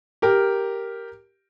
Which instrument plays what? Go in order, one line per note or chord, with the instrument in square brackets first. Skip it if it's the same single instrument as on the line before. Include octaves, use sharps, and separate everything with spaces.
[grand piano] G4 A#4